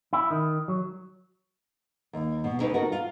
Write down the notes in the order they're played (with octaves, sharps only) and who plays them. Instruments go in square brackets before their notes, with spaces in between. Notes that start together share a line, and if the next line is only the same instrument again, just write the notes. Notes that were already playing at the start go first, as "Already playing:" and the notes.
[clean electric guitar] E4
D#3
F#3
[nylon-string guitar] D#2
B2
D2 D#4 B4
D#4 F#4 A4 A#4
F4